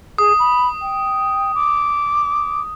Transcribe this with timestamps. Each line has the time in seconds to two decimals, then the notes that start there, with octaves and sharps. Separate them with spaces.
0.18 G#4 D#6
0.39 B5
0.81 G5
1.55 D6